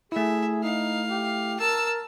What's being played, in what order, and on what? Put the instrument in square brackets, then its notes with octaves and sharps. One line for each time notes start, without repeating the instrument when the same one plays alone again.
[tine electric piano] A3 E4 [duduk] G#4 [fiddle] E5
[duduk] D#4 [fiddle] F5
[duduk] G4
[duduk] A#4 [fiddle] A5 E6